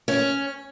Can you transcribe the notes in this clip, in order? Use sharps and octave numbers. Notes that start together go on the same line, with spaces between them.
C#4